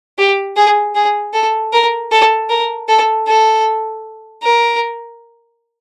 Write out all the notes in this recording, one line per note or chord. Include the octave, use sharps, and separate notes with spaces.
G4
G#4
G#4
A4
A#4
A4
A#4
A4
A4
A#4